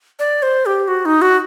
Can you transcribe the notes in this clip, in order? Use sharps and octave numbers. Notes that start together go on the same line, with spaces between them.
D5
C5
G4
F#4
D#4
F#4